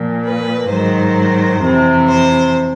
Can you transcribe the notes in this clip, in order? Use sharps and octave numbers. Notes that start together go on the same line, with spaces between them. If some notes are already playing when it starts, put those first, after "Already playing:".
Already playing: A#2 F3
B4
G#2 D#3 F#3 C5
F2 C3 E3
C5